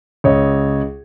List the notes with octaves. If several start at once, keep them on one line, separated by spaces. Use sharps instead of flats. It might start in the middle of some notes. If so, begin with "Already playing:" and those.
C#2 C#5 D#5